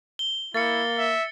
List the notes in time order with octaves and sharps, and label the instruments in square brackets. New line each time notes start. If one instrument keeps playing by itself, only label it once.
[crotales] G7
[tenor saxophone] A#3 [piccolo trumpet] E4 [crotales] A6 C#7
[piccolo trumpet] E5